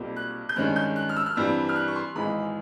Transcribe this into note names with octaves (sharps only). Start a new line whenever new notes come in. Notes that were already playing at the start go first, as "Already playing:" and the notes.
Already playing: B1 A#2 G3 C4
F#6
G6
G2 D#3 G#3 C#4 F#6
G6
F#6
F6
E6
F6
G2 E3 G3 C4 E6
F6
F#6
C#6
C6
G#1 G#2 E3 G#3 B5